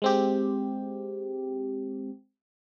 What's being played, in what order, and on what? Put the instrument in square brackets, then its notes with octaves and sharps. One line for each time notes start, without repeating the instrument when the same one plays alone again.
[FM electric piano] G#3 C4 G4